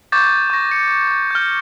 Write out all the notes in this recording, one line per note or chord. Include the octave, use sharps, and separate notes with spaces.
C#6 D6 G6 A6
C#6 A#6
C#7
F6 G6